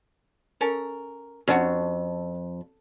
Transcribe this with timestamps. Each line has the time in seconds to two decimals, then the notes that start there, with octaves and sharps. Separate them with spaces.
0.61 C#4 A4 A#4
1.48 F2 C#4 D4 F#4